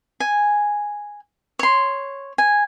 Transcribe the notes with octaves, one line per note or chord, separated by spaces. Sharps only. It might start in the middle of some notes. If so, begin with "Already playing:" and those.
G#5
C#5 C6
G#5